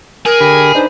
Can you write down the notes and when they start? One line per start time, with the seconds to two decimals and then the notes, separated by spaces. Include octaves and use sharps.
0.25 G#4 A#4
0.41 D3 G4 B5
0.75 D4 D#4 B4 C5